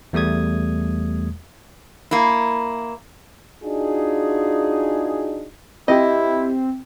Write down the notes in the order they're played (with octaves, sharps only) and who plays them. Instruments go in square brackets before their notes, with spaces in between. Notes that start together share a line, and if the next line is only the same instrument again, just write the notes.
[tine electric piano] E2 G3 A3 D#6 G#6
[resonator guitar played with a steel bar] A#3 E4
[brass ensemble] D4 D#4 F4 F#4 G#4
[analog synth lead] C4 [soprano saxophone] E4 [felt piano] G4 G5 [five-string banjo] D#5